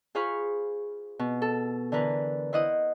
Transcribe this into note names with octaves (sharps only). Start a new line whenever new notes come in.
F4 G#4 C5 F5 B5 C#6
B2
A4
D3 E3 A#4 B4
E4 C5 D#5 F#5 D#6